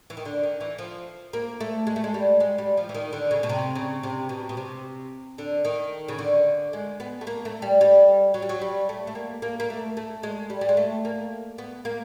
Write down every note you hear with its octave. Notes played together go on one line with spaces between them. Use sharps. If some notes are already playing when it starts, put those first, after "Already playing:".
E3
D#3
D3
D#3
E3
F3
A#3
A3
G#3
A3
G#3
G3
G#3
G3
F3
E3
D#3
D3
C#3
B2
C3
C#3
C3
B2
B2
C3
D3
D#3
C#3
D3
G#3
B3
A3
A#3
A3
G3
G3
F#3
G3
F#3
G3
A3
A3
A#3
A#3
A#3
A3
A3
G#3
G3
G3
G#3
A3
A#3
B3
A#3